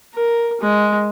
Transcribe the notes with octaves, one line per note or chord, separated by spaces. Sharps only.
A#4
G#3